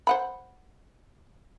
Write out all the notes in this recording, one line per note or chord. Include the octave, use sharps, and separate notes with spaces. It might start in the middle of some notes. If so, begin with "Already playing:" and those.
C5 F#5 B5